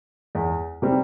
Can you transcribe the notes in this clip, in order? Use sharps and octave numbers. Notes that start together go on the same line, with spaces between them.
E2
C3 G3 C4